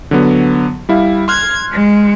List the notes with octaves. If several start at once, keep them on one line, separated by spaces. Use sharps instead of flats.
D3 F#3 B3
G3 E4 F5
C6 F6 F#6 G#6
G#3